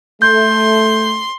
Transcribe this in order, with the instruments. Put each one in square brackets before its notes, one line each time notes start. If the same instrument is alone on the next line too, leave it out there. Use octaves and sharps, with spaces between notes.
[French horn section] A3 [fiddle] C6 [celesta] G6